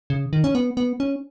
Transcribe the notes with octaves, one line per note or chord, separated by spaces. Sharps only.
C#3
D#3
C#4
B3
B3
C#4